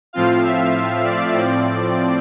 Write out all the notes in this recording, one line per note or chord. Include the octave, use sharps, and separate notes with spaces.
A2 F3 C4 F4 F5
E5
D5
A2 F3 C4